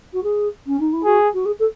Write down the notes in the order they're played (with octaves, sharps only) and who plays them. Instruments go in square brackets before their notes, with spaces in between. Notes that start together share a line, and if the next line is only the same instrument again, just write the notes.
[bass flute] F#4
G#4
C#4
D#4
E4
[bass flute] F#4 [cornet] G#4
[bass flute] F#4
G#4
A4